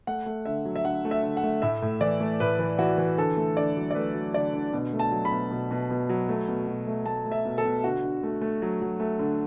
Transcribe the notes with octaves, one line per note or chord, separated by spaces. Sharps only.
A3 F#5
A3
D3 E5
F#3
E5
D3 F#5
A3
E5
D3
F#5
A3
A2 E5
A2
E3 D5
A3
A2 B4
E3
E3 F#4
E3
D3 A4
A3
D3 D5
F#3
D5
A3 B4
F#3
D3 D5
D3
B2
A3
A5
F#3
B5
B2
B2
B2
B2
F#3
A3
B2
B2
A3
A3 A5
A3
E5
B2
A4
B2
D3 F#4
D3
A3
A3
F#3
F#3
A3
D3